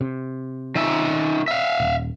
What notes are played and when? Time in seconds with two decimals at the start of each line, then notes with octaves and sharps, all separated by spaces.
0.01 C3
0.75 D#3 E5
1.48 E5 F5
1.80 D#1